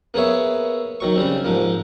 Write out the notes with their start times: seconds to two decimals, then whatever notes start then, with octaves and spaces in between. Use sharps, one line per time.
0.14 A#3 B3 G#4 C#5 E5
1.00 D#3 F#3 C#6
1.16 C#3 G3 C4
1.45 G#2 F3 A#3